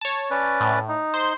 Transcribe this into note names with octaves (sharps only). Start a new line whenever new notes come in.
C#5 A5
C#4 B4 D5
A2
D#4
C5 C6